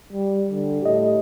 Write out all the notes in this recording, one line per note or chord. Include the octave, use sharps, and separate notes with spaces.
G3
D3
A2 G4 D#5